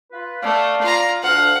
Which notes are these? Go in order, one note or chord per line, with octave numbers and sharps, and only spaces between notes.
F4 B4
A3 D5 F5
F4 A#5
D2 D4 F5 F#5